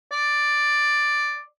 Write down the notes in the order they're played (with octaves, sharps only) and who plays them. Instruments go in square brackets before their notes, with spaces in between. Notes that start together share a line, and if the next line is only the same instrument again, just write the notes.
[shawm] D5